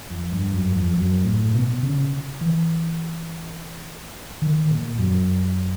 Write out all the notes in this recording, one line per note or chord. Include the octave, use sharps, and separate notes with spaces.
F2
G2
F#2
F2
F#2
A2
B2
C#3
E3
D#3
A#2
F#2